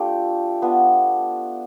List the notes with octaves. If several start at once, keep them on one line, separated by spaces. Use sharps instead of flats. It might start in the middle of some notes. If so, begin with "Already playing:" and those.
Already playing: A3 D4 F4 G4
B3 D4 F4